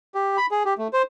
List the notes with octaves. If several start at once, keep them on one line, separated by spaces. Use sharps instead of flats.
G4
B5
G#4
G4
A3
C5